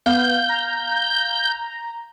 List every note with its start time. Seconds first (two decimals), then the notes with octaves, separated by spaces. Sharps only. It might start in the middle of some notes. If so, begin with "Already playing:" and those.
0.06 B3 F5 G6
0.49 A#5